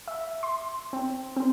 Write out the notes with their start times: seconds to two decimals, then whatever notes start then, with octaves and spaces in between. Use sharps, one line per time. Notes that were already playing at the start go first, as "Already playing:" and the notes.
0.08 E5
0.43 C6
0.93 C4
1.37 C4